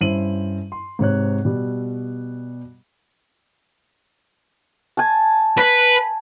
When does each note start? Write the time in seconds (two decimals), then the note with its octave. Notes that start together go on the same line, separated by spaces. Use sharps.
0.01 G2 C#4 E4 C5 D#7 F#7
0.72 C6
0.99 G#2 C3 C#5 F#6
1.45 B2 G3
4.97 G#5 A5
5.58 B4